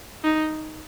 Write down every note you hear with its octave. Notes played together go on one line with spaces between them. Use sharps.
D#4